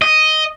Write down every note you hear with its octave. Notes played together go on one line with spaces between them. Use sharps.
D#5